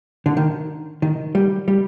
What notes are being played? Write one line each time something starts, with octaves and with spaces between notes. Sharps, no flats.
D3
D#3
D#3
G3
G3